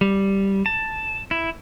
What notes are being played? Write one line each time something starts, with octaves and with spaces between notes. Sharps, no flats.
G3
A5
E4